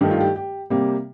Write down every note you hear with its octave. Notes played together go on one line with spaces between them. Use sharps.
G2 D#3 A3 G4
F4
G4
G4
C3 G3 A#3 G4